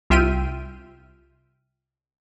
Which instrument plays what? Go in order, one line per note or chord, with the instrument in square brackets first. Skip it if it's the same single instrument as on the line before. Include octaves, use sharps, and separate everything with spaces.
[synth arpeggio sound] C2 F4 E5 G5 F6 D#7